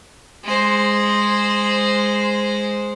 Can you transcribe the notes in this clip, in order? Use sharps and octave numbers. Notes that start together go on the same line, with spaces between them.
G#3 C5